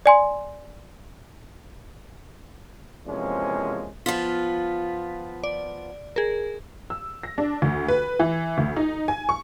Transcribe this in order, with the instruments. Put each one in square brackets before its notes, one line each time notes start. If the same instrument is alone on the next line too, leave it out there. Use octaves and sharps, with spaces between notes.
[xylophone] D5 G#5 C6
[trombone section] E2 C3 F3 G#3 A#3 C#4
[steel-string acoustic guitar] F3 B3 F4 [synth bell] B6
[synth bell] D5
G#4 A#4
[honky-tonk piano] E6
A#6
D4
D2
B4
E3
D2
D#4
G#5
C#6